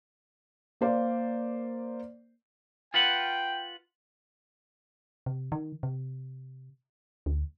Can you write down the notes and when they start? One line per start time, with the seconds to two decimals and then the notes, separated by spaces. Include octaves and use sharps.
0.81 A#3 A#4 C5 D5 F5
2.94 F4 B4 F#5 G5
5.26 C3
5.52 D#3
5.83 C3
7.26 D2